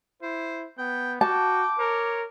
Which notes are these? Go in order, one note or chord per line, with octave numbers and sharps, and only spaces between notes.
E4 C5
B3 G5
F#4 G5 A5 D6
A#4 C#5